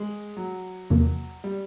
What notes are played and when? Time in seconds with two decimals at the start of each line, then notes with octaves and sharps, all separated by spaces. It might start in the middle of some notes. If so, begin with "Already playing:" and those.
Already playing: G#3
0.37 F#3
0.90 E2 C3 F3 A#3
1.44 G3